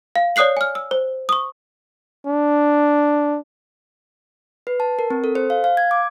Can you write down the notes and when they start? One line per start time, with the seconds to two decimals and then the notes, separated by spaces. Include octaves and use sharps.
0.16 F5
0.36 C#5 D5 D#6 F#6 C7 F#7
0.57 G#5 F6
0.75 E6
0.91 C5
1.29 C#6 D#6
2.27 D4
4.67 B4
4.80 A5
4.99 A#4
5.10 C4
5.24 A4
5.35 C5
5.50 F5
5.64 F5
5.77 G#6
5.91 D6